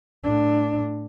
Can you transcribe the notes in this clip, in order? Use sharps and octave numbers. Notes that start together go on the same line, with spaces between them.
A2 D4